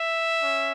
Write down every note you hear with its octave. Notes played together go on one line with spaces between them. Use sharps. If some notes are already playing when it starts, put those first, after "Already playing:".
Already playing: E5
C#4